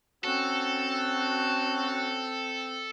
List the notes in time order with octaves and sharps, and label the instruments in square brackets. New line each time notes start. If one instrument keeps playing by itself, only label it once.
[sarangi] C4 [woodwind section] C#4 F#4 [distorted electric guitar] A4